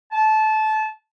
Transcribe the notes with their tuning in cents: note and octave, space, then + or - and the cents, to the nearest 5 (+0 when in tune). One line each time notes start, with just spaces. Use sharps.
A5 -20